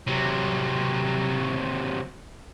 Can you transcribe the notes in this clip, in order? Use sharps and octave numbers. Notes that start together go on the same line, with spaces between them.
C3 F#3